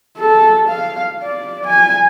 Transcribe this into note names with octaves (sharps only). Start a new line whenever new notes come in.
A4
F5
D5
G#5